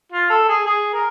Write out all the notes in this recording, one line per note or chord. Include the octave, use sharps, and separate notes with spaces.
F4
A4
G#4
G#4
A#4